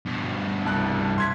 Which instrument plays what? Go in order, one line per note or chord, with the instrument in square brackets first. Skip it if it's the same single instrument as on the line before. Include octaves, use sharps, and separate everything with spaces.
[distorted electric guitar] G2 B2
[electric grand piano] C2 A5 F#6
C6 G#6 B6